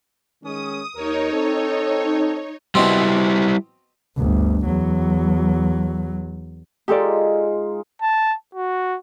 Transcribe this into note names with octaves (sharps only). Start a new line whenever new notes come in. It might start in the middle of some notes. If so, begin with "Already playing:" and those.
D#3 G#3 C#4 D#6
D#2 D#4 A#4 C#5
C4 A4
B2 G3 C4 E4
G1 D2
E2 F#3
G#3 D#4 F4 G4 A4 D5
A5
F#4